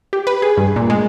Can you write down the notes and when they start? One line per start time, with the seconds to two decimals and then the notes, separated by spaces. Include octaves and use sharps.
0.13 G4
0.27 B4
0.42 G#4
0.57 G2
0.76 A#2
0.90 G#3